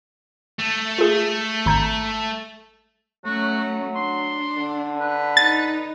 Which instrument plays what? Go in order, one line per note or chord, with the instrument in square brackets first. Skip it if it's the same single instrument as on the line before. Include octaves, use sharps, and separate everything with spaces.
[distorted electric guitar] A3
[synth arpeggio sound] F4 G#4
G#1 A#5 G6
[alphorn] F#3 [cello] A3 C#4 [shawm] F#4
[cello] D4 [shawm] C6
[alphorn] D3
[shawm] B4
[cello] D#4 [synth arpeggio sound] A6